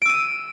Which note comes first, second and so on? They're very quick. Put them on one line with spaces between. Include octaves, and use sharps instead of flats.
D7 E6 D#7